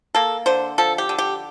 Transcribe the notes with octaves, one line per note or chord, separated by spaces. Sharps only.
A#3 A4
D3 C5
F3 A4
G4
D3
G4